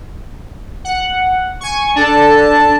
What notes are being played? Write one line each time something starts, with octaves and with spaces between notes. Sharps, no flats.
F#5
G#5 C#6
D4 A4 A5